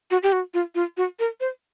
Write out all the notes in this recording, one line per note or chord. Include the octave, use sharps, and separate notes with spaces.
F#4
G4
F#4
F4
F4
F#4
A#4
C5